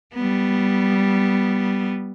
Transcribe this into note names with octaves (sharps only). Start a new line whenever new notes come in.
G3 B3